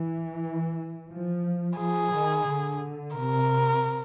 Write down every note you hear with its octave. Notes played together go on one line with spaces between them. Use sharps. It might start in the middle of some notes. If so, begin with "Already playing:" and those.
Already playing: E3
F3
F3 G#4
D#3
D3
C3 A#4